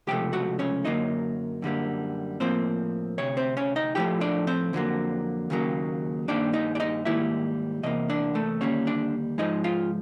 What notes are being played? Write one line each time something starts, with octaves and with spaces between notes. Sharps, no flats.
C#2 C3 F3 A3 G4 G5
F#4 F#5
C#4 C#5
F#2 D3 F#3 A#3 D#4 D#5
F#2 D3 G3 A#3
A2 F3 A#3 C4 C5
D2 C3 C#5
C4 C5
C#4 C#5
D#4 D#5
A2 F3 A3 G4 G5
D4 D5
C4 C5
F2 D3 F#3 A#3
D#2 C#3 F#3 A#3
G2 D#3 G3 A#3 D4 D5
D#4 D#5
D5
D#4 D#5
G#2 D#3 G3 A#3 E4 E5
E2 C3 A#3 D#5
D4 D5
A3 A4
D#2 D3 G3 A#3 C#4 C#5
D4 D5
G#2 F3 G#3 D#4 D#5
F4 F5